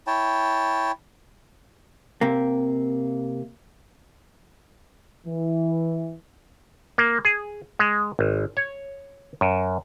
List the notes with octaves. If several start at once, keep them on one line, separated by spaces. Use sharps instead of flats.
E4 C#5 G5 A5
C3 A#3
E3
A#3
G#4
G#3
G#1
C#5
F#2